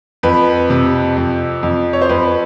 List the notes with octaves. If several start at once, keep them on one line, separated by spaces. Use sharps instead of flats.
F2 B4
C3
F2
F2
C#5
C5
F2 B4